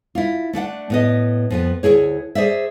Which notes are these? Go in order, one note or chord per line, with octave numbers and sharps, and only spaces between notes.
E4 F4
A3 D4 E5 F#5
A2 B3 D#5
F2 F3 B3
D2 B2 E4 G#4 C#5
G#4 C5 D5 E5